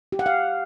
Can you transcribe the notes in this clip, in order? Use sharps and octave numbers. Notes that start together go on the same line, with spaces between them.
G4
F#5
F5